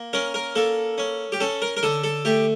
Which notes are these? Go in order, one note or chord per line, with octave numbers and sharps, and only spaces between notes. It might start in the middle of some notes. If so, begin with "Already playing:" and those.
Already playing: A#3
C#4 A#4
A#4
A#3 A4
C#4
G4
C#4 A4
A#4
A#4
D3 A4
A4
A3 G4